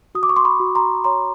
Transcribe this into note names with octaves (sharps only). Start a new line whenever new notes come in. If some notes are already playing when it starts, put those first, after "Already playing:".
F#4 D#6
D6
C#6
C6 D6
B5 C#6
F#4
A#5 C6
C#5 A#5 C6